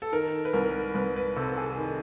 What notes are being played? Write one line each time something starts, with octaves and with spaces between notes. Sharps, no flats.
A4
D#3 A#4
B4
C2 A#4
C2 B4
B4
C3 A4
A4
G#4
D#3